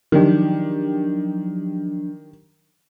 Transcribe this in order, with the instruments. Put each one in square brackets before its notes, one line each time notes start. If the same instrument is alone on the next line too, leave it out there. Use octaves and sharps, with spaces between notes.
[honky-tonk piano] D#3 G4 [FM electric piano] F3 F#3 D4